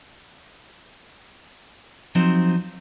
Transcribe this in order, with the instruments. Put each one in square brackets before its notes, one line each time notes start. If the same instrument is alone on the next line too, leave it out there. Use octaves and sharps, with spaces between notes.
[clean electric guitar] F3 F#3 C4 D#4